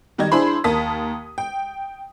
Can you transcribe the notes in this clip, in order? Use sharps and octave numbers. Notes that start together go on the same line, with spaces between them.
D#3 G3 G4 D#5 G#6
D4 E4 G#4 C5 B5 C6
D#2 A#4 A5 D#6 B6
G5